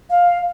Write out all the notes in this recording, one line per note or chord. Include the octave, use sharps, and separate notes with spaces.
F5